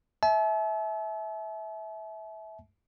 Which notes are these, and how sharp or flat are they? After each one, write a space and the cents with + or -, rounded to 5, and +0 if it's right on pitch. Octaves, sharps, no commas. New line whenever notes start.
E5 -20 A5 -45